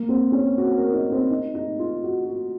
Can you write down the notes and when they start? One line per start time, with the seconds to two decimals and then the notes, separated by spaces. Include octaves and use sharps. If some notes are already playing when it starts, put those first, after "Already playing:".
Already playing: A#3
0.09 C4
0.32 C#4
0.58 F#4
0.76 A#4
0.93 D#4
1.12 C4
1.31 D#4
1.55 D#4
1.79 F4
2.04 F#4
2.27 F#4